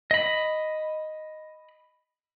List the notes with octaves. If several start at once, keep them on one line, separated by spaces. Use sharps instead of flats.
D#5 B5